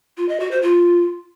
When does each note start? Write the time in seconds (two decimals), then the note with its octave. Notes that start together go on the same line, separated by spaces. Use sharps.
0.17 F4
0.29 D#5
0.40 F#4
0.51 C5
0.63 F4